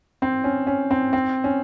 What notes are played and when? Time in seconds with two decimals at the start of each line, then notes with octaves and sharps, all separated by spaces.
0.22 C4
0.44 C#4
0.67 C#4
0.91 C4
1.13 C4
1.44 C#4